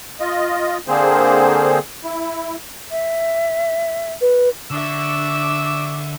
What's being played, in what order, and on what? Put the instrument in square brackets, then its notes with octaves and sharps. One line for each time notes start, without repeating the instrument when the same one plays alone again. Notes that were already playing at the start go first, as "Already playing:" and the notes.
[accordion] F4 D#5
D3 A#3 C4 G#4 C5
E4
[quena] E5
[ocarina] B4
[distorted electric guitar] D3 [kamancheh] D4 E5 [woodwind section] C#6 D6 [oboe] E6